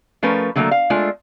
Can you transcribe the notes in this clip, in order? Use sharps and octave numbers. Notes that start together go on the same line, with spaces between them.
F3 A3 C#4 A#4 B4
D3 F#3 A3 A#3
F5
G#3 A3 D4 F4